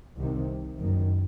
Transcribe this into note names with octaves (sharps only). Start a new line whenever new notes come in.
C2 C3 D#3
F#1 F#2 D#3